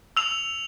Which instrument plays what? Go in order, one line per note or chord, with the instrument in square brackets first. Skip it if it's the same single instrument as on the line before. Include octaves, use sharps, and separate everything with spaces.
[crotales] E6 F7